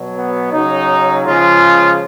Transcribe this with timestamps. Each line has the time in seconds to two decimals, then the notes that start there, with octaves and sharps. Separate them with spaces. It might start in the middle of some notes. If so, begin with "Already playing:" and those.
Already playing: B2 F#3
0.17 B3
0.53 C#3 F#3 D#4
1.27 C#3 F3 G#3 F4